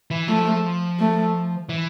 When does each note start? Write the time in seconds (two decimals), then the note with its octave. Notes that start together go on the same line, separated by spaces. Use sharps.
0.11 E3
0.28 F3 A3
0.99 A3
1.69 E3